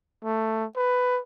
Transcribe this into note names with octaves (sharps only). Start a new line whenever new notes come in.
A3
B4